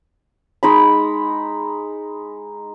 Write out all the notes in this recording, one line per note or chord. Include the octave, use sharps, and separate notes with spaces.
G#3 D#4 B5